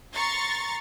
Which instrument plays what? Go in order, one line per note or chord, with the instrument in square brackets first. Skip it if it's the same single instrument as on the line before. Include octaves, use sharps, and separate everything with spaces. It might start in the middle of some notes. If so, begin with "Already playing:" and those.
[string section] A#5 C6 C#6 A6